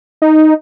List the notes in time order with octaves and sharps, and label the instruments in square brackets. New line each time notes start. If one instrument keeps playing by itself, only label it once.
[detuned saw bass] D#4